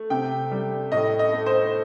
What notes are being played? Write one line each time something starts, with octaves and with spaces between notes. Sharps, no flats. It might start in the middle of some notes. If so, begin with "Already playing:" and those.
Already playing: A3
C3 G5
G3
A2 D#5
D#5
A3
C5